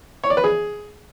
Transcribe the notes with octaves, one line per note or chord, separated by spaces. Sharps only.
C#5
D5
B4
G#4